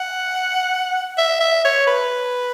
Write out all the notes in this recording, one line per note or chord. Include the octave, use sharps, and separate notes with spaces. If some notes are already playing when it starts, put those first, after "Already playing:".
Already playing: F#5
E5
E5
C#5
B4